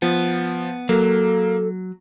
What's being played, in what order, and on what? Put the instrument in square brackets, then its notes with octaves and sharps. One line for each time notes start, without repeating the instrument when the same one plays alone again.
[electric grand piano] F3 [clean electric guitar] B3
[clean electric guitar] F#3 [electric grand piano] A#3 [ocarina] A4